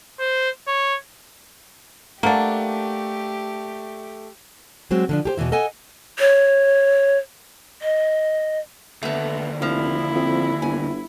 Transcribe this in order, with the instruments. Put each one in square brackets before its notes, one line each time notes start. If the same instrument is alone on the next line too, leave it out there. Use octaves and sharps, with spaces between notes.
[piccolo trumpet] C5
C#5
[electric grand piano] A3 [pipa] A#3 D4 [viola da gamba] G4 [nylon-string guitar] A#4 F#5
[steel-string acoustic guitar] F#3 G#3 C4 F#4
D3 F3 D4
G4 G#4 C5
E2 B2 D#3 E3 E4
A4 D#5 F#5 G#5
[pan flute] C#5
D#5
[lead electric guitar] D#2 D3 [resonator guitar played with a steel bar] A3 B3
[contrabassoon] F1 [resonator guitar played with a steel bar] F3 [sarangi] E4
[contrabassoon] F2
[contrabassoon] G1 [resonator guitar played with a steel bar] G#5